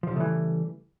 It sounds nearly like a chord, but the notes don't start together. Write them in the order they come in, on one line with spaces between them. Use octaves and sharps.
F3 G3 C#3 A3 E3